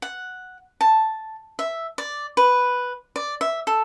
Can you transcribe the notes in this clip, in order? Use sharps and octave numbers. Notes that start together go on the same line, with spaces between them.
F#5
A5
E5
D5
B4
D5
E5
A4